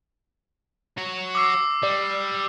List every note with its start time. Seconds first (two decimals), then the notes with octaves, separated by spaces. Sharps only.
0.98 F#4 C#5
1.35 D6 E6 C7
1.83 G3 D5